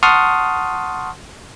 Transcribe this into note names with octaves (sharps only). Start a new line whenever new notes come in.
F#5 A5 C6 C#6 D#6 F6